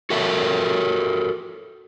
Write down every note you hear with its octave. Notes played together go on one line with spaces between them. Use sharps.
F#4 A4 A#4 E5